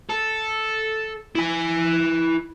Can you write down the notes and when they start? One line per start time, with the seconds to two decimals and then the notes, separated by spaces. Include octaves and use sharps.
0.09 A4
1.35 E4 G#5